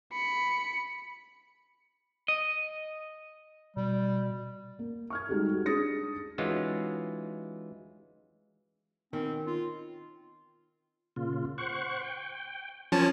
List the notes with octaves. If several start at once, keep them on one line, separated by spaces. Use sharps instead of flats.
B5 C#7
D#5
B2 G3
A#3
C#6 F6 G#6
G3 G#3 D#4 F#4 G4 A4
F#4
D4 G#4 D#6 A6 A#6 C#7
E3 G#3 C#4 D#4 F4 F#4
B2 D#3 C4 C#4
F4
A#2 C#3 F4
C5 F#5 C#6
G5
F3 C#4 A#4 C#5 G#5 A5